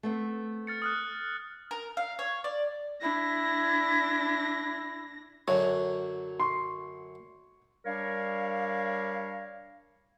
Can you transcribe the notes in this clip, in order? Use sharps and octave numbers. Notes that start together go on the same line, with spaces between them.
A3 B3 C4
F6 A6 C#7
D#6 F6 F#6
A#4
F5
C#5
D5
D4 E4 A#6
F#2 D3 F#3 C#5
C6 C#6
G3 D4 A#4 C#5 F5